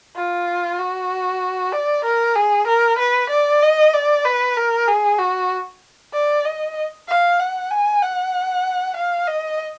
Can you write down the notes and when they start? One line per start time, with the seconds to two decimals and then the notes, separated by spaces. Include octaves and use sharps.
0.16 F4
0.79 F#4
1.73 D5
2.05 A#4
2.36 G#4
2.67 A#4
2.99 B4
3.30 D5
3.62 D#5
3.94 D5
4.25 B4
4.57 A#4
4.88 G#4
5.19 F#4
6.13 D5
6.45 D#5
7.08 F5
7.39 F#5
7.71 G#5
8.02 F#5
8.97 F5
9.27 D#5